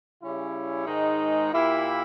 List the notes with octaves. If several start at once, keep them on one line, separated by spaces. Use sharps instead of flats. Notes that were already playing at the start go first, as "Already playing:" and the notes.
C#3 G3 C#4 E4
G#2 D#3 G#3 D#4
A#2 A#3 E4 G4